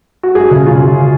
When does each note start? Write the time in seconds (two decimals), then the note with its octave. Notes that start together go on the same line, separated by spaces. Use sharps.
0.23 F#4
0.35 F#2 G#4
0.51 C#3
0.66 C#3 F4
0.82 F#2